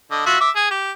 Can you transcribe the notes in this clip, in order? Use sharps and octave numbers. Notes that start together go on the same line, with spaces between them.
D3 D#5
F4 F#4 E5
E5 D6
G#4
G4